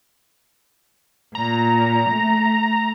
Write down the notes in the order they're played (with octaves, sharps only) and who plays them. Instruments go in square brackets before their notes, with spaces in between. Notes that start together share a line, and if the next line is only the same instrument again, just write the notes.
[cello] A#2 [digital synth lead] A#5
[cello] A3